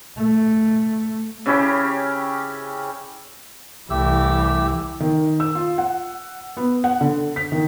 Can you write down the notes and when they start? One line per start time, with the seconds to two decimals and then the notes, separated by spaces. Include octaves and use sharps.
0.17 A3
1.46 C#3 C#4 E4 G4
3.90 C2 E3 A3 G4 E6
5.00 D#3
5.40 E6
5.55 F4
5.78 F#5
6.57 B3
6.84 F#5
7.01 D3
7.36 B6
7.52 D#3